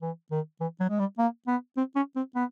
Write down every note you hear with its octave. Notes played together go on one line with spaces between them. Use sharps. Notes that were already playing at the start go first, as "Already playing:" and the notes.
E3
D#3
E3
F#3
G#3
G3
A#3
B3
C4
C#4
C4
B3